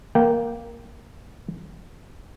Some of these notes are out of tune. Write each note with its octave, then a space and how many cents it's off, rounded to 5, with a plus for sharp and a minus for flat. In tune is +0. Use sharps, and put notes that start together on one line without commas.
A#3 +0 G5 -15